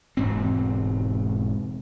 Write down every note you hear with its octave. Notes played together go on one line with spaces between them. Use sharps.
E1 G#2 C4